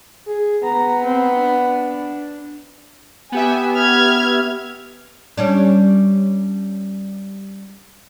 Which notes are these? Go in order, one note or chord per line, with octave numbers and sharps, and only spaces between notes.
G#4
B3 A#5
C4
D4
B3 G4 E5 G#5
F6 G#6
G3 C#4 D4